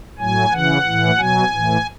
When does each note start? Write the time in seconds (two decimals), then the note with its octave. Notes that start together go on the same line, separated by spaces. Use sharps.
0.19 A2 F#3 G#5
0.51 C#3 E3 F#5
0.85 A2 E3
1.18 B2 F#3 G#5
1.51 A2 E3